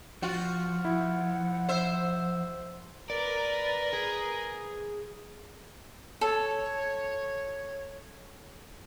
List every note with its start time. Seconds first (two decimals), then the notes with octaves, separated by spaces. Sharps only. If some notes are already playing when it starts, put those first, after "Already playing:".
0.22 F3 F4 F#4
0.85 E4 F#5
1.69 C5 E5
3.10 A#4 B4 D5
3.93 G#4
6.21 A4 C#5